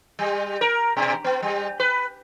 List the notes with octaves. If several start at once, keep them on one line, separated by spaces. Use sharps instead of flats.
G3
A#4
B2
B3
G3
B4